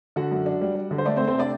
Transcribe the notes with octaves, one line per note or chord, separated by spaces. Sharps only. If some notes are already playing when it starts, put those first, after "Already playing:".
D3 F#4 F#5
F#2
D4
G3
G3
D3
C5
A3 D4 D5
C4 C5
A3
C4 C5
C3 D4 D5